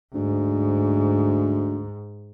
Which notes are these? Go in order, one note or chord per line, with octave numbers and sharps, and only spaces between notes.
D2 G#2